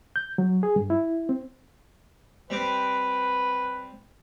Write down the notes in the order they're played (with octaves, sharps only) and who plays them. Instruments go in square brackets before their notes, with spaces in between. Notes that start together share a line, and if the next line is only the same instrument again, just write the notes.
[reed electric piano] G6
F#3
G#4
G2
E4
C4
[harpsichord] G3 C4 D6 [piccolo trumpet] B4